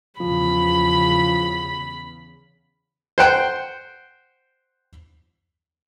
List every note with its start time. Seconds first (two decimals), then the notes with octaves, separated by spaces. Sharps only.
0.20 E2 C#3 F3 B5
3.18 C5 F#5 G5